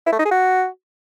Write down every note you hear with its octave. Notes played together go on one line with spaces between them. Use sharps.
E4
A3
D#4
G#4
F#4